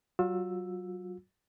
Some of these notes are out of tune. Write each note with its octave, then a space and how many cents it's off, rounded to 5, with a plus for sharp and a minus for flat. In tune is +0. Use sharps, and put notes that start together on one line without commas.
F#3 +30 F4 +40 E6 +0